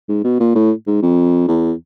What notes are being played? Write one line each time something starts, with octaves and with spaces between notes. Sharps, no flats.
G#2
B2
A#2
A2
G#2
F2
E2